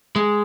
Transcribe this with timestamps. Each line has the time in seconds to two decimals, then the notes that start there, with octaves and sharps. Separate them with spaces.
0.16 G#3